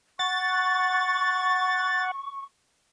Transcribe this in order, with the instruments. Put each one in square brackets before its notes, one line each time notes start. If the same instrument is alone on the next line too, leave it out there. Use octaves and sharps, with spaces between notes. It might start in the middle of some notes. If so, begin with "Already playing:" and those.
[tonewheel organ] F#5 [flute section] C#6 [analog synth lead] A6